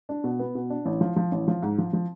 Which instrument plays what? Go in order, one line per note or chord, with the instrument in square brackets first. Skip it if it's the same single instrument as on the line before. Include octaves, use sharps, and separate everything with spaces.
[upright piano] D4
B2
B3
B2
D4
A1
F3
F3
A1
F3
G#2
F3
F3